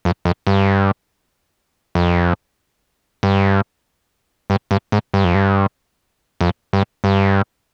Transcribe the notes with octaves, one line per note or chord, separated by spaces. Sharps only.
F2
F2
G2
F2
G2
G2
G2
G#2
G2
F2
G2
F2
G2
G2